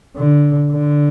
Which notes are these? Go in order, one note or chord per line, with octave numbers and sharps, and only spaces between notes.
D3
D3